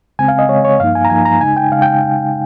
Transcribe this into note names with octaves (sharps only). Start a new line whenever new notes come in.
C#3 G#3 C4 G#5
F5
D#5
C#3 G#3 C4 C#5
C#5
G2 F3 A#3 D#4 F5
G#5
A#5
G2 F3 A#3 D#4 G#5
A#5
C#3 G#3 D#4 G#5
G5
C#3 G#3 D#4 F5
G5